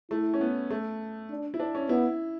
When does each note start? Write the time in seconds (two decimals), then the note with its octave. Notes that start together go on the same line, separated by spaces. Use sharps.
0.11 A3 E4
0.34 C#4
0.41 B3
0.70 A3
1.30 D4
1.54 E4
1.60 D4
1.75 C#4
1.89 B3 E4